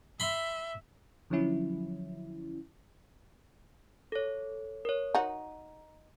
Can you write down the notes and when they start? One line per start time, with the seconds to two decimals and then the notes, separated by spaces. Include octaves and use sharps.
0.20 E5 B5 C6
1.30 D3 F3 F#3 C#4 E4
4.12 A4 C#5
4.85 A#4 C#5
5.15 D#4 F#4 A#5